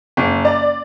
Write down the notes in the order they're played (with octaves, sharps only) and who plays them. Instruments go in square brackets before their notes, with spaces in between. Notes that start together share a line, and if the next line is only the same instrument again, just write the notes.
[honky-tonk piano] F#1
D5